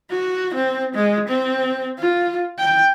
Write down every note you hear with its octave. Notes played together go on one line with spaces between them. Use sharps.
F#4
C4
G#3
C4
F4
G5